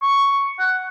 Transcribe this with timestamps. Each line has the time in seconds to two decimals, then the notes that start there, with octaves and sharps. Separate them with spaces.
0.02 C#6
0.59 F#5